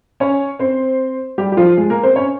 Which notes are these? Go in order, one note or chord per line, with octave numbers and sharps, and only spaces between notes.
C#4 C#5
C4 C5
G3 G4
G4
F3 F4
G#3 G#4
A#3 A#4
C4 C5
C#4 C#5